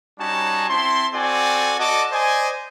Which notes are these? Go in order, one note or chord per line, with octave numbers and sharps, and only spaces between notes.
G3 C#4 D#4 F#4 G#5 A5
C4 E4 A5 C6
C4 F#4 A4 D5 G#5
F#4 A4 D5 D#5 A5 D6
C5 D5 D#5 G#5